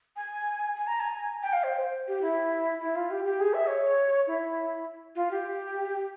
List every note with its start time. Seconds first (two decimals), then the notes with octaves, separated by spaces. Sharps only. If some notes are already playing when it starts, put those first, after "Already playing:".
0.16 G#5
0.75 G#5
0.87 A#5
1.00 G#5
1.43 G5
1.53 F5
1.63 C5
1.77 C5
2.07 G4
2.21 E4
2.80 E4
2.95 F4
3.10 G4
3.25 G4
3.40 G#4
3.54 E5
3.68 C#5
4.27 E4
5.15 F4
5.31 G4